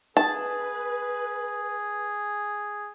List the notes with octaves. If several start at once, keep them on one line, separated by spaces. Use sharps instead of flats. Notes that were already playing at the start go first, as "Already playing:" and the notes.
G#4 B4 A5